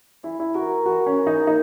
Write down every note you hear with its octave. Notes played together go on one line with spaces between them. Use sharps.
E3 E4
E4
F#4 A#4
E3 F#4
C#4
A#4
D#4
A#3 D#4